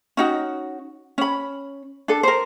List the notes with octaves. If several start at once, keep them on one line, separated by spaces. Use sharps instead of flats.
C#4 D#4 F#4
C#4 B5
D4 A4
A#4 C5